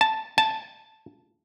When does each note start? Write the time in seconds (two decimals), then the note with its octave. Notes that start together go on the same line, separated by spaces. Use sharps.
0.01 A5
0.38 A5